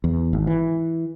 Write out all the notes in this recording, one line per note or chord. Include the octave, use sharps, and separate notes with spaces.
E2
G#1
E3